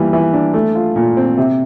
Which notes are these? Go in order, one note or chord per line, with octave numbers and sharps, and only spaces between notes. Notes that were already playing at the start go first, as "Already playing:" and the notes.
Already playing: E3 G3 A#3
E3
D4
A3
F4
A#2
C4
C3